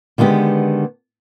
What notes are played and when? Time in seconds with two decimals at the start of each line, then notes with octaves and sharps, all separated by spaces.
0.18 D3 D#3 G#3 B3 G4